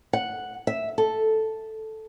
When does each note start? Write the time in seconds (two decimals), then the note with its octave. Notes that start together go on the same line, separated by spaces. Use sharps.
0.13 F#5
0.67 E5
0.98 A4